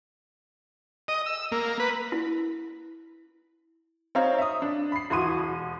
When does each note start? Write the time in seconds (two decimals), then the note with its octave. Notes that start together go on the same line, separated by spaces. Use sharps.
1.08 D#5
1.26 E6
1.52 A#3
1.80 B4
2.12 E4
4.15 C4 D#4 C#5 F5 A#5
4.38 E5 D#6
4.62 D4
4.92 B5 C7
5.10 D#1 E3 F#4 C6 D#6 D#7
5.38 E1